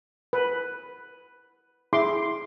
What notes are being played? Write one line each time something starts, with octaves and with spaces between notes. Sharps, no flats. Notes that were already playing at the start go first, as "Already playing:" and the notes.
B4
E4 G#4 C6 D6